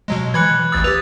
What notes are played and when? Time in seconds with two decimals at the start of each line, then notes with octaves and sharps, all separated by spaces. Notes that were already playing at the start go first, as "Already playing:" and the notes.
0.08 B2 F#3 G#3
0.34 E3 B5 F#6 G#6 C#7
0.72 A1 D2 D#6 E6 A6
0.84 G4 B4 F7